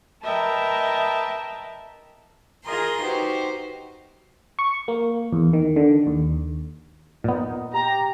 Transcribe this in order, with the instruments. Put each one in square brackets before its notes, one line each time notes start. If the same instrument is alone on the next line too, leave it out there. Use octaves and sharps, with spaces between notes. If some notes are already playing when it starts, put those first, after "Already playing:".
[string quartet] A#4 B4 D#5 E5 G5 A5
F4 G#4 A#4 D#5 A#5 C6
D#4 F#4 G4 B4 C5
[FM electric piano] C#6
A#3
E2
D#3
D3
D#2
[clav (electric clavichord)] A#2 B3 [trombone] D#4
[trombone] G4 [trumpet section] A#5